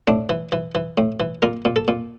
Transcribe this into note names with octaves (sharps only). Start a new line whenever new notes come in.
A2 D4
E3
E3
E3
A2
E3
A#2 A#4
A#2
A4
A#2